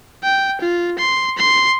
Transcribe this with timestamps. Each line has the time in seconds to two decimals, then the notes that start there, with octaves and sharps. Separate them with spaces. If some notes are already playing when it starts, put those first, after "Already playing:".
0.24 G5
0.61 F4
0.99 C6
1.38 C6